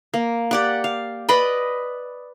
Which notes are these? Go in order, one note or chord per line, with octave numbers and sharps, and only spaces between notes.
A#3
G4 D5 F#5
F5
B4 D5 D#5 B5